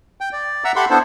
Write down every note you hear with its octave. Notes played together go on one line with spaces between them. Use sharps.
G5
D5
E5 F#5 A#5 E6
G4 A4 E5 F#5 B5 C6
B3 D4 E4 A4 C5